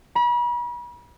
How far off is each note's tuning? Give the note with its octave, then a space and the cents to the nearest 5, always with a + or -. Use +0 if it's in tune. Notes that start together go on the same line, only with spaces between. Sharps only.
B5 -40